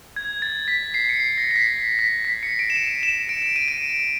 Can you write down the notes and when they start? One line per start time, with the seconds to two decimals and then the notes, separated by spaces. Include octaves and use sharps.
0.16 G#6
0.42 A6
0.68 B6
0.94 C7
1.09 C#7
1.20 C7
1.38 A#6
1.51 C7
1.56 B6
1.99 B6
2.25 B6
2.43 C#7
2.59 D7
2.70 E7
2.76 D#7
3.03 E7
3.29 D7
3.42 D7
3.56 D#7
3.68 D7